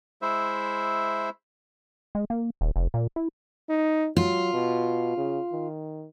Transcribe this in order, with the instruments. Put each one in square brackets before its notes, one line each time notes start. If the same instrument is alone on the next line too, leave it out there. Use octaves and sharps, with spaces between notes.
[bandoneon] G#3 E4 C5 E5
[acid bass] G#3
A#3
D#1
F1
A#2
E4
[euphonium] D#4
[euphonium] F#3 [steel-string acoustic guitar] F4
[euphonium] B2
C#3
D#3